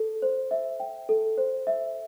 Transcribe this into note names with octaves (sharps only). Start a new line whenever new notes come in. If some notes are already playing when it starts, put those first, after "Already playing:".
Already playing: A4
C5
E5
G5
A4
C5
E5